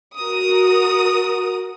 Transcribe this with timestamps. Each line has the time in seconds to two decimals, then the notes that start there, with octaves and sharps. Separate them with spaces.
0.18 F#4 A#4 D#6